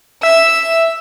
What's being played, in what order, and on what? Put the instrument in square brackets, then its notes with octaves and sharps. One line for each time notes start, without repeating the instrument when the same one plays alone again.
[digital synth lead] E5 [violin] E6